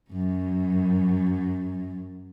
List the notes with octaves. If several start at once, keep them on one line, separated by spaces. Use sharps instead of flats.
F#2 F#3